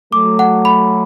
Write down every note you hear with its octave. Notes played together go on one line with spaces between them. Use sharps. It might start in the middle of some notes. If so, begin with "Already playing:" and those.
F#3 A3 D6
F#5
B5